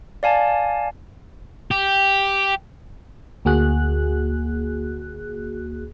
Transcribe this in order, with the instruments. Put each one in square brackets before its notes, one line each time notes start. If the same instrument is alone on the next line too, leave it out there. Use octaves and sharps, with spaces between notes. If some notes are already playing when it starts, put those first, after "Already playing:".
[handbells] D5 F5 G#5 A5
[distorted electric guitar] G4
[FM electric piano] D2 A#3 F#4 G#4 F#6